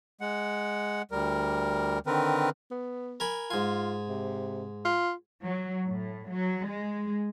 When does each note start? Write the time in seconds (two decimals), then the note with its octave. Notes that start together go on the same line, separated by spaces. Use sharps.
0.21 G#3 F#5
1.11 D2 G3 A#4
2.07 D3 D#3 C4 A#4 B4
2.71 B3
3.20 A#4 G#5 B5
3.51 G#2 F4 G#5
4.09 C3
4.85 F4
5.43 F#3
5.87 A2
6.29 F#3
6.66 G#3